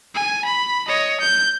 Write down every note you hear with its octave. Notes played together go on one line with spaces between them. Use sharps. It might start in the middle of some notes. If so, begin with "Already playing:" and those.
G#5
B5
C#5 D#5
G6